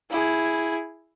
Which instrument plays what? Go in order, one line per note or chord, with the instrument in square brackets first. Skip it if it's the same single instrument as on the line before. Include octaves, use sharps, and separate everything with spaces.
[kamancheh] E4 G#4